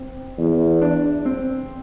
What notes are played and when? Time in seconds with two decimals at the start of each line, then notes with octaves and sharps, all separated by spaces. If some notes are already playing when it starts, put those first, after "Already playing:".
Already playing: C4
0.38 E2
0.82 D4
1.26 C4